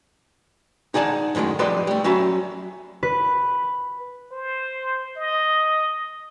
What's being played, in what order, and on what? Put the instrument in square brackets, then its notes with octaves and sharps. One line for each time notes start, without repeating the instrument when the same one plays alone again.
[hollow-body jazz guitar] D#4 G#4 D5 F#5 A5
F#2 A2 D#3 G3 G#3
F2 G3 B4 D5 D#5 C6
G3 A3
F#3 C#4 E5 B5
[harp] B4
[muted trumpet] C5
D#5